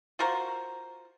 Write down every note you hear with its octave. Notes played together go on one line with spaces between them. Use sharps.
F4 F#4 A#4 C5